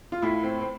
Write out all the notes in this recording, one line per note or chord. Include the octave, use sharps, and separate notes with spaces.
F4
A2 E4
C4
C4